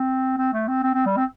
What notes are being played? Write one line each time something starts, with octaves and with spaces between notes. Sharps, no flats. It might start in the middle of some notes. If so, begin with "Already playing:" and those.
Already playing: C4
C4
A3
C4
C4
C4
G3
C4